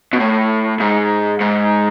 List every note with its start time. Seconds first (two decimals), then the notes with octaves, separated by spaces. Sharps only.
0.13 B2
0.20 A2
0.80 G#2
1.41 G#2